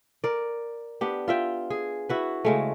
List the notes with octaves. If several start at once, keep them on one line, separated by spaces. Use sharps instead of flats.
A#4 D5
B3 D4 G4
F4 E5 G5
G#4
E4 F#4 B4
C#3 G#3 A3